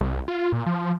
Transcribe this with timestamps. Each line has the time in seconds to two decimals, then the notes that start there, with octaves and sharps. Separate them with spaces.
0.01 C2
0.28 F4
0.52 A#2
0.66 F3